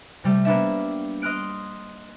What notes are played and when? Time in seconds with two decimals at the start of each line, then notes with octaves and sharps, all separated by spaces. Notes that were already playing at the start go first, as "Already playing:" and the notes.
0.24 C3 G3 A3
0.45 A#3 B3 D4 E5
1.22 D#5 C6 F6 F#6 D7